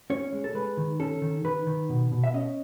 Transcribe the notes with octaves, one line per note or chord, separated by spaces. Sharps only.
C#4 C#5
G#3
A4
G#3 B4
D#3
C#4 A4
D#3
D#3 B4
D#3
B2
B2
E5
C#4 D#5